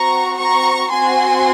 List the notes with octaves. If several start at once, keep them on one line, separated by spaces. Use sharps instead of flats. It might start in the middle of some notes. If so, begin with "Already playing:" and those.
Already playing: C4 F#4 A#5 C#6
A#5 C#6
C4 F#4 G#5 C6